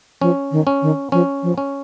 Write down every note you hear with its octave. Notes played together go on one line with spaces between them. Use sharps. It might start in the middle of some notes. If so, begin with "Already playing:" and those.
F3 C#4
D#3
C#4
D#3
F3 C#4
F3
C#4